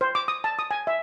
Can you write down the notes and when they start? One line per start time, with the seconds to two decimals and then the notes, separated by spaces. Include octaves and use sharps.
0.01 C5
0.15 D6
0.28 D#6
0.44 A5
0.59 D#6
0.71 G#5
0.87 E5